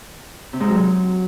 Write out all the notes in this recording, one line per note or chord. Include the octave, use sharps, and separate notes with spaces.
C3
G#2
F#3